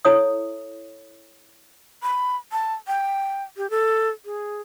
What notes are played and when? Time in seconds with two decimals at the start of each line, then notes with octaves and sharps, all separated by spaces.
0.05 E4 A4 C#5 E5 D#6
2.03 B5
2.52 A5
2.88 G5
3.57 G4
3.70 A4
4.25 G#4